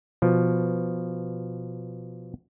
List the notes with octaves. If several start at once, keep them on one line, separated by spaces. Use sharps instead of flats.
B2 F3